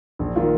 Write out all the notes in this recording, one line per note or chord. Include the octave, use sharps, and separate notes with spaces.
A#1
D#3 A#3 F4